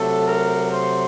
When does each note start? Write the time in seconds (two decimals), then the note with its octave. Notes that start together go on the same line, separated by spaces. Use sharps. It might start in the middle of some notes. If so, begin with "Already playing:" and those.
Already playing: C3 F#3 A3 A4
0.26 A#4
0.72 C5